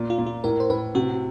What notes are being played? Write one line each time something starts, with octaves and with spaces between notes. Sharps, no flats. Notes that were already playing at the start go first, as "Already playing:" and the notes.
Already playing: A#2
F4
A#2
F4
A2 A#4
C5
A2 B4
C3 F#4